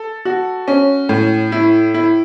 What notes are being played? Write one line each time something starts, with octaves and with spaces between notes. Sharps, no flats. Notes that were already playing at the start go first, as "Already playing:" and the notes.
Already playing: A4
F#4
C#4
A2
E4
E4